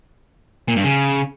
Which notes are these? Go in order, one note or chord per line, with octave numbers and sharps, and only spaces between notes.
A#2
G2
C#3